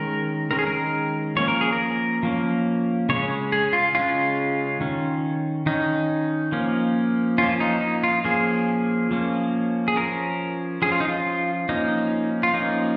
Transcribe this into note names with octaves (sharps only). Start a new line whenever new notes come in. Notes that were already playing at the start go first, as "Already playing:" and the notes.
Already playing: D#3 G#3 C#4 A#4
D#3 G#3 C#4 A#4
G#4
A#4
F3 A#3 C#4 C#5
A#4
G#4
A#4
F3 A#3 C#4
C#3 G#3 C#4 C#5
G#4
F4
C#3 G#3 C#4 F4
D#3 C#4
D#3 C#4 D#4
F3 A#3 C#4
F3 A#3 C#4 F4
D#4
D#4
F4
F3 A#3 C#4 G#4
F3 A#3 C#4
G#4
F3 C#4 A#4
F3 C#4 G#4
F4
D#4
F4
F3 A#3 C#4 D#4
F4
F3 A#3 C#4 D#4